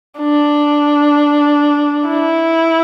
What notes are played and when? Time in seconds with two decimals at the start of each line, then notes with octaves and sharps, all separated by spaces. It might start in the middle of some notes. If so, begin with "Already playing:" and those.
0.20 D4
2.09 E4